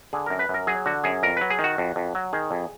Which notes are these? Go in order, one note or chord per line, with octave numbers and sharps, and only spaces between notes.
D3 G#4
F#2 A#4
B4
F#2 A#4
F#3 G#4
D3 F#4
F#2 G#4
F2 A#4
F#3 B4
G#4
D#3
F#4
F2
F2
F#3
D#3 G#4
F2